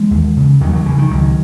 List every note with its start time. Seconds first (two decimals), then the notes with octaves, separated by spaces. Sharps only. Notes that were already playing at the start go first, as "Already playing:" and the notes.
Already playing: E3 G#3
0.11 D#2
0.37 C#3
0.61 D#2 D#3 F#3
0.73 D#3 F#3
0.86 C#3 E3
0.98 D#3
1.10 C#2 D#3 F#3